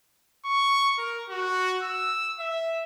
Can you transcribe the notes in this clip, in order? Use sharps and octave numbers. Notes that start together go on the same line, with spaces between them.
C#6
A#4
F#4
E6
E5